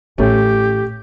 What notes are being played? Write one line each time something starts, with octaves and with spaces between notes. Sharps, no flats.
A1 A3 C#4 G4